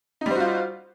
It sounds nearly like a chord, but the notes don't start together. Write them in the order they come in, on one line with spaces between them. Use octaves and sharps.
D#4 G3 C5 F#4 F4